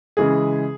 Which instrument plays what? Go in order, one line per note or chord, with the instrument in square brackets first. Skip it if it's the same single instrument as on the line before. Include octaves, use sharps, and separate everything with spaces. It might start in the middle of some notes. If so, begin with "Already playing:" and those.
[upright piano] C#3 E3 G#3 G#4